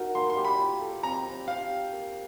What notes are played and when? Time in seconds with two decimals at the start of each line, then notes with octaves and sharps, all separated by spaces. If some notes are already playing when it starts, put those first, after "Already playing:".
Already playing: D#4 F#4 A#4
0.15 A#3 C6
0.30 C6
0.37 G4
0.45 B5
0.59 F4
0.81 A4
1.03 C4 A#5
1.25 C4
1.48 G4 F5
1.70 G4
1.92 A#3